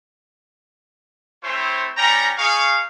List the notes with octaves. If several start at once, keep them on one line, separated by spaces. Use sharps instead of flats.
A3 C4 E4 C5 C#5
G3 C#4 G5 A#5
D#4 G#4 F5 C#6